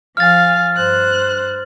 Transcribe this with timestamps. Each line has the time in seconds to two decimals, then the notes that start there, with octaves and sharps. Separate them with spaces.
0.17 F3 F5 G#5 F6 A6
0.75 G2 C5 F#6